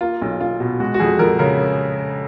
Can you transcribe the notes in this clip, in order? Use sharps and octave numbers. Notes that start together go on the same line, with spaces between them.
A#3 F4
B1
B1 F4
B2
G#3 F#4
F#4
F2 G#4
F2 A#4
C#3 A#4